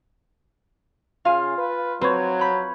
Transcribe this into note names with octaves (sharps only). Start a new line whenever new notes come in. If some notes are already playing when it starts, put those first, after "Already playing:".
C#3 F4 F5 G#5
B4
F#3 C4 B4 C#5
B5 G6